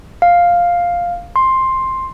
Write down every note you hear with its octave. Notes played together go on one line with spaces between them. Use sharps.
F5
C6